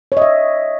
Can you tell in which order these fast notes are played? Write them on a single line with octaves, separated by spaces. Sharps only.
C#5 D#5 E5